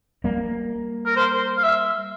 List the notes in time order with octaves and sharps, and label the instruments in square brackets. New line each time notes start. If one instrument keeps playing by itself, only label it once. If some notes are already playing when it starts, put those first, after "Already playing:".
[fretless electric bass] G3 A#3
[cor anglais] A#4
C5
F5
E5